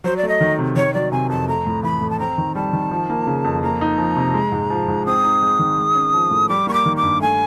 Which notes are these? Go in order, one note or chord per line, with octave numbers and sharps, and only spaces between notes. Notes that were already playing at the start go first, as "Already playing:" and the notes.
F#3 C5
D5
A3
D#5
D#3
C3
D#3 C#5
F#3 D5
C3 G#5
F2 A5
A3 A#5
A2
E3 B5
A2
A5
C4 A#5
D#3
G3 A5
D#3
F3
A#3
C#3
F2
A#3 A#5
D#4
F3
C3
G#3
G#2
F3
G#2
C4 D#6
D#4
G#3
D#3
G#3
C#4
F3
A2
G3 D6
A#3 C#6
D6
D#3
D6
G2
A3 G#5